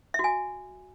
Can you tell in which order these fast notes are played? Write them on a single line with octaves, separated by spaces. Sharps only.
E5 F#4 G#5